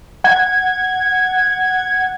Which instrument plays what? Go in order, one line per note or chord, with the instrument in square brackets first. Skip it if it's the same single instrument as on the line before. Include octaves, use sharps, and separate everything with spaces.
[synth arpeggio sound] F#5 G#6